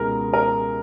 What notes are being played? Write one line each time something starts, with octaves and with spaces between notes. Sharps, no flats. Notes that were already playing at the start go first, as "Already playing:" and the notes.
Already playing: C#2 B2 G#3 A#4
A#4